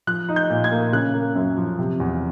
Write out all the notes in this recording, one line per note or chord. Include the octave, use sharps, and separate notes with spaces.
F3 F#6
D#4
G6
A#2
G#6
A#3
C#3 F#6
A#3
F#2
F3
C3
E2